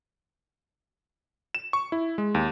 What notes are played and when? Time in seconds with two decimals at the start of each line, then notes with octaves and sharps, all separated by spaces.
1.55 E7
1.73 C#6
1.92 E4
2.18 G#3
2.35 D#2